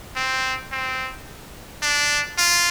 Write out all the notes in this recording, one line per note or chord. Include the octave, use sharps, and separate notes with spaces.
C4
C4
D4
F4